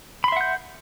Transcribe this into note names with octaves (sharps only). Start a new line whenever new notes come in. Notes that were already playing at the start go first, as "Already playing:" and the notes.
E5 F#5 B5 C6 G6